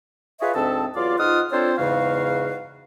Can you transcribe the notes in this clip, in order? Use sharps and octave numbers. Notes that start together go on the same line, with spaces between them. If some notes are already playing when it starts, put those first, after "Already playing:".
F4 G#4 B4 C#5 D#5 E5
D2 G#2 C4 A4 D#5 A5
E2 F#3 F4 D5 F5 D6
G#2 D#4 F4 F#5 D#6 F6
C4 D4 F4 A4 C5 C#5
E2 G#2 C#3 F#4 F5